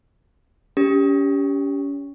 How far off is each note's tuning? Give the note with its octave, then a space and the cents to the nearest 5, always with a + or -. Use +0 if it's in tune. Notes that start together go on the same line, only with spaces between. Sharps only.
C#4 +30 G4 +0